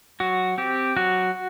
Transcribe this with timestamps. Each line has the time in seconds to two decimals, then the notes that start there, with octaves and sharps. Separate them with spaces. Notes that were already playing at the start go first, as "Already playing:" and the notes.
0.20 F#3 F#4
0.58 C4 G4
0.96 F#3 F#4